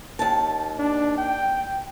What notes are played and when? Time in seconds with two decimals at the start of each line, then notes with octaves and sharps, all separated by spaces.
0.19 D#2 A5
0.78 D4
1.18 G5